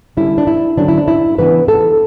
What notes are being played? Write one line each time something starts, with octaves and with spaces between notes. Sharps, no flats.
D3 G3 C#4 E4
D4
E4
D3 F#3 C#4 D4
E4
D4
E4
C#3 E3 B3 D4 B4
A4